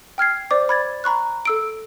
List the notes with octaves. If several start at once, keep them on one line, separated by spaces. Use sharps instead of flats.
G5 F6 G#6 C7
C5 D5 D6
B5 G#6 A6
A#5 B5 C#6 F#6
A4 E6 D7